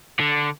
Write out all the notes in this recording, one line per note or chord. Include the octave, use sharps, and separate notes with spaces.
D3